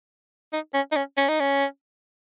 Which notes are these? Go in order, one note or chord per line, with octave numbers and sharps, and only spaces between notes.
D#4
C#4
D#4
C#4
C#4
D#4
C#4